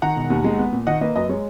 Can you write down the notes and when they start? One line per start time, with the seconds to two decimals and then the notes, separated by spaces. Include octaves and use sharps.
0.02 D#3 F#5 A#5
0.16 E1
0.30 D#2
0.44 G#3
0.59 B3
0.72 A#2
0.87 D#3 D#5 F#5
1.01 A#3 B4 D#5
1.15 F#2 B4 D#5
1.29 G#3 C#5